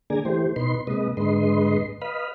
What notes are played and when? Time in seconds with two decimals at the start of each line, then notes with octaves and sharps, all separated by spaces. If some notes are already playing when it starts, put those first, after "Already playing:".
0.10 D3 A#3 G#4 D5 G#5 A#5
0.25 E3 A3 G4 C5
0.56 B2 D#4 B4 C6
0.87 C3 G#3 A#3 B4 D#5
1.17 G#2 D3 G#3 B4 D#5 C6
2.02 B4 D#5 F5 B5